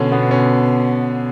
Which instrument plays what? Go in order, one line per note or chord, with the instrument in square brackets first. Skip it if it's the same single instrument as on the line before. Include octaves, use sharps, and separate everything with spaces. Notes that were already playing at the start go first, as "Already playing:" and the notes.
Already playing: [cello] B2 [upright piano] D3 C#4
[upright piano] B3
C#4